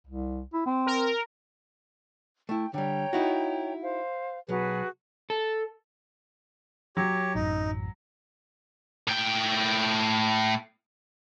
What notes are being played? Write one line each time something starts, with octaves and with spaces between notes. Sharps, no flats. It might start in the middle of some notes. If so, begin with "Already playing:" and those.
C2
E4
C4
A#4
A3 E4 G5
D3 G3 C#5 G5 A#5
D#4 E4 F#4
C5 F5
B1 F#3 F#4 G#4 B4
A4
F#3 G4 C#5
A1 F#2 D#4
A2 G5